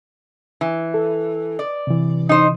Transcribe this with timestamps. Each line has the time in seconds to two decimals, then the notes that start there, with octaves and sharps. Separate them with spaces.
0.61 E3
0.94 A4
1.59 D5
1.87 C3 E3
2.29 D#4 C5